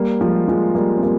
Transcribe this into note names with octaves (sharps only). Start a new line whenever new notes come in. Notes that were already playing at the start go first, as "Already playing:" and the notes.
Already playing: G3 A#3
F3 G#3
F3 G#3
G3 A#3
C4
G3 A#3